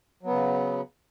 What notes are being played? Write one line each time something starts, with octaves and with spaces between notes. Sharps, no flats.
C#3 F#3 B3